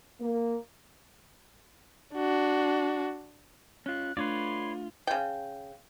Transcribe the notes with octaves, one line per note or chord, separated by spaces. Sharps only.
A#3
D4 F#4
C#4 F4 F#6
A3 D4 F4 B4 C#5 D5 C6
C#3 G5